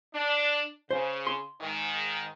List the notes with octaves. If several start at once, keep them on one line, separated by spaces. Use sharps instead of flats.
D4
C#3 C5
C6
G#2 D#3